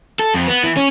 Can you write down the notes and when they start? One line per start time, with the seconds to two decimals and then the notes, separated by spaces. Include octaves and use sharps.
0.19 A4
0.34 F2
0.47 B3
0.63 E3
0.77 C#4